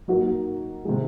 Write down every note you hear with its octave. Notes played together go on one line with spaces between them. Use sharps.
F#3 A#3 D#4 F#4 A#4
C3 D#3 G#3